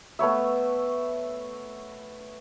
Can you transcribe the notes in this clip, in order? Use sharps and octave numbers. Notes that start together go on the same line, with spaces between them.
A3 B3 C#5 E5